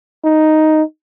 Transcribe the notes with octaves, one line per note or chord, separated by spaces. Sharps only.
D#4